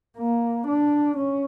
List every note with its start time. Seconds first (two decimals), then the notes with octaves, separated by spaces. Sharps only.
0.17 A#3
0.67 D4
1.17 C#4